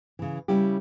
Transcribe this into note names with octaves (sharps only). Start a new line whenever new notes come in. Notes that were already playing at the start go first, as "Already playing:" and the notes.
C#3 E3
C#3 G3 C#4 E4 G4